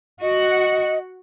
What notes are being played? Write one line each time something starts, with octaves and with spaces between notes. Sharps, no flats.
F#4 D#5 F#5